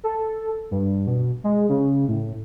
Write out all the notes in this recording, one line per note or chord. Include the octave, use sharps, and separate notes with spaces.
A4
G2
B2
G#3
C#3
A2